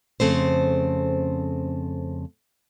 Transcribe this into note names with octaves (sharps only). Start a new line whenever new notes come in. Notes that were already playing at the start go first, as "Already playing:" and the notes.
F2 C#3 A3 C4 C5